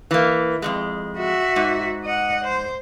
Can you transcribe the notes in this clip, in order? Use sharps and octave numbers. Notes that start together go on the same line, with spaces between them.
E3 A#3
F2 G#2 G#3
F#4 E5
G#2
D#5 F#5
C5